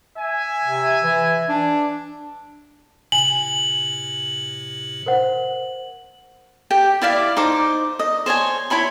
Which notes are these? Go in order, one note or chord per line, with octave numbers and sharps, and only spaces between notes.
E5 G#5
C3
E3
D4
A2 C3 G#5 F#7
A#4 C5 F#5
G4 G5
E4 D5 F5 D6
D#4 C5 D6
D#5
C5 C#5 D#5 G#5
E4 C#5 B5 C6